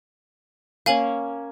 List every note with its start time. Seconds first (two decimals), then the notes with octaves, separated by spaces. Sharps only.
0.86 A#3 C#4 F5 G#5 F#7